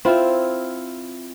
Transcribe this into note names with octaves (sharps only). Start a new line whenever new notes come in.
C4 E4 F4